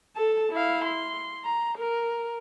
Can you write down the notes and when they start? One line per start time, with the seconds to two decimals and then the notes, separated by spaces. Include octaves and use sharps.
0.16 A4 A5
0.52 E4 F5
0.85 C6
1.45 A#5
1.78 A#4